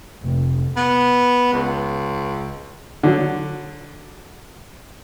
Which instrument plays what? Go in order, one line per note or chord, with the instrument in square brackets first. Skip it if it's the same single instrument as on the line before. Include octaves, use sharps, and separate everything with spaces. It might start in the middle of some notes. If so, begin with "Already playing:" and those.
[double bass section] F1
[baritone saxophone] B3
C#2
[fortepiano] D3 F#3